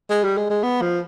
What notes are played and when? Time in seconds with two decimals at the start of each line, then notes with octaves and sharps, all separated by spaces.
0.10 G#3
0.24 G3
0.37 G#3
0.50 G#3
0.63 B3
0.81 F3